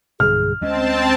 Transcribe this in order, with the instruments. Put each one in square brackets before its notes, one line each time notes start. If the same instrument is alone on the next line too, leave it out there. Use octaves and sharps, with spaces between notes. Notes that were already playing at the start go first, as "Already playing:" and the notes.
[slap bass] B1 G2 D3 [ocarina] G#4 [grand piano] F6
[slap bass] D2 G#3 C#4 [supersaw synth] C4 A5 [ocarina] D#5